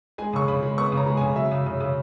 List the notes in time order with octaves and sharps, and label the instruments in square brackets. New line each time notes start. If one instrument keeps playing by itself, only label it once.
[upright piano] G#3 G#5
C#3 C#6
C#3 B5
G#3
B3 C#6
C#3
A#5
G#3
C#3 G#5
F#3 E5
C#3
C#3
C#3